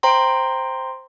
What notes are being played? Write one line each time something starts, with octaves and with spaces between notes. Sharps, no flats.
C5 G5 A#5 C6